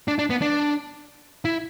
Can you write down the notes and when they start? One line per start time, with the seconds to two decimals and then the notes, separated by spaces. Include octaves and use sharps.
0.08 D4
0.19 D4
0.30 B3
0.41 D4
1.45 E4